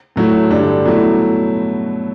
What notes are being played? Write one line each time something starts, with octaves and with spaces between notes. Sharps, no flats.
A2 F#3 A3 E4
G2 D3 G3 D4
B2 F#3 A3 E4